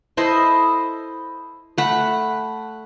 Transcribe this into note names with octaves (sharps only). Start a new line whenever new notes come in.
E4 A4 C5 D#5
A3 F#5 B5